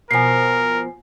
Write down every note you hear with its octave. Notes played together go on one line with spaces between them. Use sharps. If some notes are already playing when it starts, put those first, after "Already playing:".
B2 F3 A#4 G#5 C7